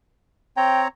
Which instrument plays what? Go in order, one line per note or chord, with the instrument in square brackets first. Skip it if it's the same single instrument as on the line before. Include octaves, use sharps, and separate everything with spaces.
[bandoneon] C4 C#5 A#5 [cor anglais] G5